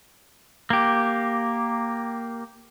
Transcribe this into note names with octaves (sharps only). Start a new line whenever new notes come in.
A#3 G4